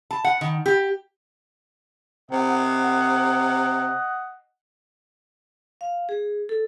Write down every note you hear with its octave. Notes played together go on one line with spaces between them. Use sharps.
A5
F#5
D#3
G4
C3 D#5 F#5
F5
G#4
A4